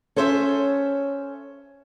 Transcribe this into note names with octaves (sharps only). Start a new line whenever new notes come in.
C#4 A4 C5 C#5 E5